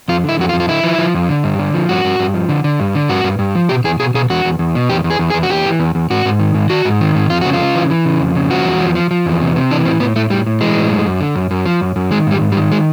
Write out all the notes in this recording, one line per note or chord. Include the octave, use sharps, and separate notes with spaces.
F2 F4
D3 E4
F2 F#4
F4
F2
F4
D3 E4
F3
F3
F2
D3
G2
D3
F3
G2 F#4
G2
G2
F3
D3
D3
G2
D3
G2 F#4
G2
G2
F3
B2 G4
E2 G#4
B2 G#4
B2 G#4
E2 F#4
E2
E2
B2
E2 G4
E2
G#4
E2
G#4
E2
F#4
E2 G4
E3
E2
E2
G#2 F#4
G#2
D#3
G#2
D#3 F#4
G#2
D#3
G#2
F2 F4
C#3 F#4
F4
C#3
E3
E3
C#3
F2
C#3
F3 F#4
E2
F3
F3
F3
E2
C3
C3
E3 D4
A2 C4
A2 B3
A2 A3
A2 G3
A2
E3 G#3
A2
F#2
F#2
D3
F#2
F#2
F3
F#2
F#2
D#3 G#3
G#2 G3
G#2
G3
D#3
G#3